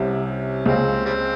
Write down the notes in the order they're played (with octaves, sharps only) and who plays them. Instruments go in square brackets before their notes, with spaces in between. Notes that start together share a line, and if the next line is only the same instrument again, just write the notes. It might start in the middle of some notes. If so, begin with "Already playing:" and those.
Already playing: [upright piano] C2 C3 [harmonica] C#4
[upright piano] C#2 C#3 [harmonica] C4
[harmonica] G3 C4